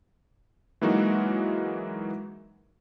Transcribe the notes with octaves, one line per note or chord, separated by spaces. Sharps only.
E3 F#3 G#3 A#3 D#4 F#4